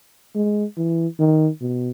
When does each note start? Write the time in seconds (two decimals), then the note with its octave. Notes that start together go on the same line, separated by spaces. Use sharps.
0.35 G#3
0.78 E3
1.20 D#3
1.61 B2